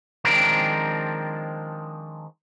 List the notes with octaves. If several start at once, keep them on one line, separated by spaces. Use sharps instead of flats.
D#3 F3 G#3 C4 D4 A#4